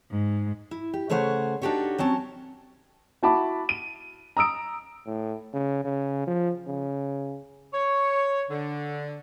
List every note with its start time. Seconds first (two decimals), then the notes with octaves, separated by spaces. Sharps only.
0.11 G#2
0.71 E4
0.94 G4
1.09 C#3 A3 C5 C#5 D#5 F#5
1.62 D4 D#4 F#4 G4 A4 C#5
1.98 F#3 C4 C#4 A5
3.23 E4 F#4 A5 B5 D6
3.69 D#7
4.37 A#5 D#6 E6 D7
5.06 A2
5.54 C#3
5.84 C#3
6.27 F3
6.67 C#3
7.74 C#5
8.50 D3